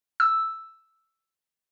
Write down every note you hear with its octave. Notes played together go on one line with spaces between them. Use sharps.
E6